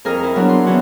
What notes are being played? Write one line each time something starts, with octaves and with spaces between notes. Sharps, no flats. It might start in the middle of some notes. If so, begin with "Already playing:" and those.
F2 G#4 A#4 F6
E4
F#3 B3 D4
C6
E3 B3 C#4 F#4